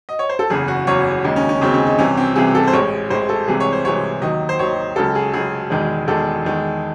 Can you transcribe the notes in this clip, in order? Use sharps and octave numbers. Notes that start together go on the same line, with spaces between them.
D#5
C#5
C5
A4
F#1 E2 C#3 G#4
F#4
F#1 E2 C#3 C#5
D#2 C#3 G#3 D#4
C#4
C#4
D#2 C#3 G#3 C4
C#4
D#4
C2 C3 E3 C#4
C4
C2 C3 E3 G#4
A4
C5
A1 A2 G#3 C#5
A1 A2 G#3 C5
A4
C2 C3 E3 G#3 G#4
C#5
C5
C2 C3 E3 G#3 C#5
D#2 D#3 F#3 D#5
C5
D#2 D#3 F#3 C#5
C#2 C#3 F#3 A4
G#4
C#2 C#3 F#3 G#4
E1 E2 D#3 G#3
E1 E2 D#3 G#3 A4
E2 D#3 G#3